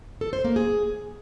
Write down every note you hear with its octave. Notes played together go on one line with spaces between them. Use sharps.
A4
C5
A#3
G#4